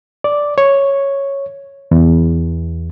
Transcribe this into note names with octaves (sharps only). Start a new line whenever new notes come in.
D5
C#5
E2